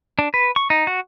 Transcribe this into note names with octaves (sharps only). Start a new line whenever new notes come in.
D4
B4
C#6
D#4
F#4